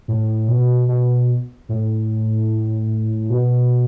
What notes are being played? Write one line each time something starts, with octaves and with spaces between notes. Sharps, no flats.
A2
B2
B2
A2
B2